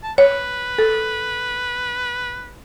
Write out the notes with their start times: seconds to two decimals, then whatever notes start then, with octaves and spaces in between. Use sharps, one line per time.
0.03 A5
0.18 B4 C#5
0.78 A4